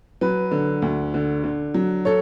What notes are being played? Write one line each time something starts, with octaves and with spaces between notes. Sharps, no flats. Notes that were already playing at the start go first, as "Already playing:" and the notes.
F#3 B4
D3
D2
D3
D3
F#3
A4 C#5